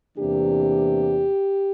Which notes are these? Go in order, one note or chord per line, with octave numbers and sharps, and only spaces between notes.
E2 C3 E3 A#3 D4 G4